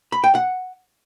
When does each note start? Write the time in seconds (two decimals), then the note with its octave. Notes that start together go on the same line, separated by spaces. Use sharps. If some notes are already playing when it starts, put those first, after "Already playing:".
0.12 B5
0.24 G5
0.35 F#5